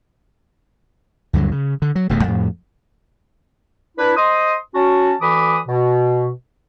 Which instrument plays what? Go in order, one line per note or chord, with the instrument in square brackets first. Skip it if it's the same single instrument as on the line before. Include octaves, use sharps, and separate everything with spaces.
[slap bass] D2 G2 D3 F#3
C#3
D3
F#3
D#1 E2 B2 A3
F2 A2
[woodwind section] D4 E4 B4
C5 D#5 C6 D#6
C#4 F#4 A5
D2 E3 B5 D6 D#6
B2